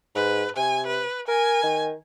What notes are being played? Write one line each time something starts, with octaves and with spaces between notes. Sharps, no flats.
G#2 B4
C3 G#5
B4
A#4 G#5
D#3